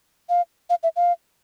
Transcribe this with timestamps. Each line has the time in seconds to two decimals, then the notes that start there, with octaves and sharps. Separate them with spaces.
0.29 F5
0.70 F5
0.83 E5
0.96 F5